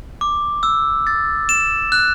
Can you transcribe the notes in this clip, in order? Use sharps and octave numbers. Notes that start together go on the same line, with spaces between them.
D6
E6
A6
E7
F#6